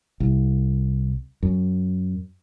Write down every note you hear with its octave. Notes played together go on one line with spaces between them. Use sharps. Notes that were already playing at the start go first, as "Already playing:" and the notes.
C2
F#2